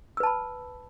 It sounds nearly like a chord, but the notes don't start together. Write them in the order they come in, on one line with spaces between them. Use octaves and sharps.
E6 B4 A5 B5